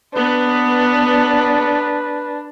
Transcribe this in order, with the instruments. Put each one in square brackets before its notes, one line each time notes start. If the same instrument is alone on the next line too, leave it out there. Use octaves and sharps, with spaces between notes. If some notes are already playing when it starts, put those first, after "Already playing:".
[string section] B3 [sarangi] D4 [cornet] B4